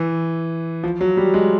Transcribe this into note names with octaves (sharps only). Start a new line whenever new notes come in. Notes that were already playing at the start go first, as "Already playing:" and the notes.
Already playing: E3
F3
F#3
G3
G#3